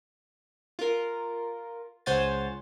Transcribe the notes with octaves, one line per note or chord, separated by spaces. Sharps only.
F4 A#4
C#2 C5 C#5 F#5 G#5 A6